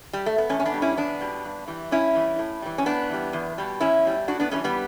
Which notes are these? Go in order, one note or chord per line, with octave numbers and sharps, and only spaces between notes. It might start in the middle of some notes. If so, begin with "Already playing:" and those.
G3
A3
B3
E2 A3 C#4
C#4
B3 D4
B2 G3
C#4 E4
E2 B3 D4
B2 G3
G2
E3 G3
G2 C#4 E4
E3 G3
A2
E3 G3
C#4
A2 B3 D4
E3 G3
E2
B2 G3
E2 C#4 E4
B2 G3
A2 D4 F#4
B3 D4
E3 G3 A3 C#4
G3 B3